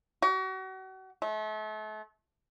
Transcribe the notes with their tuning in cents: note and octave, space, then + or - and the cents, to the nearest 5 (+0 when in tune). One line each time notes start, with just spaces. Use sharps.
F#4 +35
A3 -35